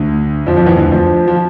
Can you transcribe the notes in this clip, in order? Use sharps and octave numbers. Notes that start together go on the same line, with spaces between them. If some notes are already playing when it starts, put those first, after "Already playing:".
Already playing: D2 D3
F2 F3
F2 F3
E2 E3
D2 D3
F2 F3
F3